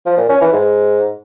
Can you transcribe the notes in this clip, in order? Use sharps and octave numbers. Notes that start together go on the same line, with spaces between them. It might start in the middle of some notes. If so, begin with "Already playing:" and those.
F3
A#2
C#4
E3
G#2